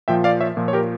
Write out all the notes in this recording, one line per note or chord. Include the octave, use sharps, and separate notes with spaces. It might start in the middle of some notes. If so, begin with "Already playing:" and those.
A#2 F3 E5 G5
D5 F5
C#5 E5
A#2 F3
C#5
G4 A#4